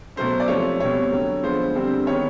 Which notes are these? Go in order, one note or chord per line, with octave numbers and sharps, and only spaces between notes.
B2 F#3 A3 C#4 C5
D5
C3 F3 A3 C#4 C#5
B2 G3 C4 C#5
D3 F#3 A3
D3 F3 G#3 B3 C5
D3 G3 C4
D#3 G#3 B3 C#5